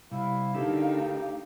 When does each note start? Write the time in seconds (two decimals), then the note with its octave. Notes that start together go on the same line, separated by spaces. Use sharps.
0.11 C3 G3 E4 F5
0.55 D2 D3 D#4 E4 G4 A4 A#4